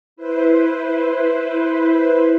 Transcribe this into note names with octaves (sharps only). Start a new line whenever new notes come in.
E4 B4 C5